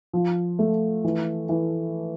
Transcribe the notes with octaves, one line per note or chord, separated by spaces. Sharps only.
F3
A3
E3
E3